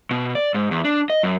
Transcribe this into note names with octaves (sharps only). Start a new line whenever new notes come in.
B2
D5
G#2
E2
D4
D#5
F#2